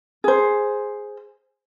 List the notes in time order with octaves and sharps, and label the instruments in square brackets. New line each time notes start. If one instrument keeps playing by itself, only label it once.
[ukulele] G#4 C5